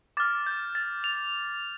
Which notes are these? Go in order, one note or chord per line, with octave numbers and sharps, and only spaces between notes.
D6 F6 A6
G6
A6
F7